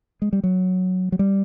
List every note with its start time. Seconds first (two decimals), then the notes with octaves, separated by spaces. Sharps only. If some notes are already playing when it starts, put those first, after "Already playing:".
0.22 G#3
0.33 G3
0.44 F#3
1.12 F#3
1.19 G3